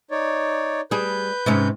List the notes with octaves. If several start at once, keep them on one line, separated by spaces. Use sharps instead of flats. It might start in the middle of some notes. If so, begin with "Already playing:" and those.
D#4 C#5 D5
G3 G#4 B4 G6
G#2 C3 C#4